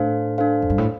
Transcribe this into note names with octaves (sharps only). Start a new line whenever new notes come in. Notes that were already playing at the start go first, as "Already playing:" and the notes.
Already playing: A2 D4 A4 C5 F5
D4 A4 C5 F5
F2
G2
A2